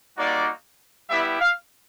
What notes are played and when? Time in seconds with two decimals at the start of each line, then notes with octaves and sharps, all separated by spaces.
0.16 G3 A#3 D#4 F#4 D5
1.08 G3 B3 E4 G4 E5
1.39 F5